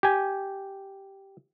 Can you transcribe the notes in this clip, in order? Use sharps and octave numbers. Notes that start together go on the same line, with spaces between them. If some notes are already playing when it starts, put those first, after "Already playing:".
G4 G#5